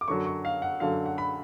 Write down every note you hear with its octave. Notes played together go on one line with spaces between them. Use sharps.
D6
F#2 D3 F#3 C#6
C#6
F5
F#5
F#2 D3 F#3 F5
F#5
B5